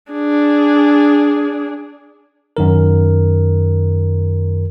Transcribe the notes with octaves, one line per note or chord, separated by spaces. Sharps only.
D4 G#4
F#2 D#3 A#4